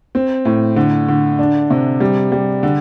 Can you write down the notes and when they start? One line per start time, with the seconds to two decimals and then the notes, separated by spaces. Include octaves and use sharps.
0.15 C4
0.45 A2
0.76 D3
1.08 D3
1.39 D4
1.70 C3
2.00 G3
2.32 G3
2.63 D3